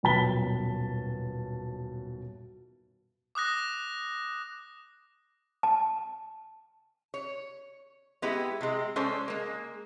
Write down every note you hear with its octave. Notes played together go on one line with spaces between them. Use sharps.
D#1 F#2 B2 A5 B6 G7
D6 D#6 F#6 A#6
A5
C#5
G#3 B3 E4 G4
C3 G#3
G#3 C#4 A4 C5 D5
G#3 A#3